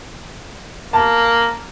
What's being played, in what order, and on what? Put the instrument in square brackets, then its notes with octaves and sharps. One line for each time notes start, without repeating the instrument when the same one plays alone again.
[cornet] A#3 [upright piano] A5